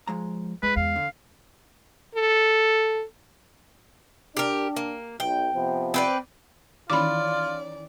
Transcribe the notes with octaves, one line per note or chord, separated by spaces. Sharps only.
F3 G#3 A#5
D2 G#3 B4
E2 F5
D3
A4
D4 G4 A#4
A#3
B1 G5
C3 F3 B3
C4 B4 D5
D#3 E3 C#4 F4 D5 B5 D6